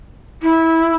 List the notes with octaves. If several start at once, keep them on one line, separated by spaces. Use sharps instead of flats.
E4